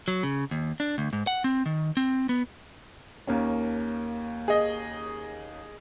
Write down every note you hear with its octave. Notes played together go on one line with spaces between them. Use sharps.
F#3
C#3
D#2
D4
D2
G#2
F#5
C4
D#3
C4
B3
D#2 A#3 C#4
G#4 D#5